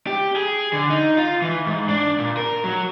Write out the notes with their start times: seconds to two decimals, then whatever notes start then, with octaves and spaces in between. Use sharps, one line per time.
0.07 G4
0.36 G#4
0.73 D3
0.90 D#4
1.18 F4
1.42 E3
1.67 G#2
1.89 D4
2.18 A#2
2.37 A#4
2.64 F#3